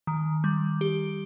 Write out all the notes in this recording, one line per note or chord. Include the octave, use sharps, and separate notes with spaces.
D#3
G3
G4